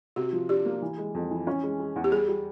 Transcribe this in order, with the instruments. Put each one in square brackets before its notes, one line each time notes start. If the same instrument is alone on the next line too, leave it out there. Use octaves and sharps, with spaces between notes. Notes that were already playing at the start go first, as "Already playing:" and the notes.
[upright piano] C3 [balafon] F#4
[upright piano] F3
[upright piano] D4 [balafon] G4
[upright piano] A#3
E3
G#3
F2
E3
C#4
G#3
G#3
E2
[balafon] G4
[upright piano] G3 [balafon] G#4
[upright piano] G3